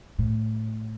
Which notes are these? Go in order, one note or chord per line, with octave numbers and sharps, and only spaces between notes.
A2